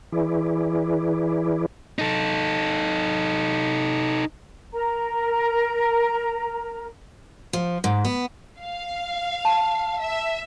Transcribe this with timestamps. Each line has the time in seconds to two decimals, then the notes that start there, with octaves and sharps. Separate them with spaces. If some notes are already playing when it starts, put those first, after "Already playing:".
0.12 E3 E4 G#4 B4 D5
1.99 D#4 A4
4.73 A#4 A#5
7.53 F3
7.84 G#2
8.05 B3
8.59 F5
9.45 A5
10.01 E5